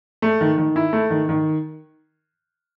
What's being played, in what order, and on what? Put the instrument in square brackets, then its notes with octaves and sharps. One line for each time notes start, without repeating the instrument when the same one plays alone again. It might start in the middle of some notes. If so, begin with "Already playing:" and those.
[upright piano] A3
D#3
D#3
E4
A3
D#3
D#3